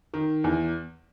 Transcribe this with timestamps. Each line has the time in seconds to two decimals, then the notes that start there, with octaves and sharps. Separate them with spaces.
0.14 D#3
0.44 E2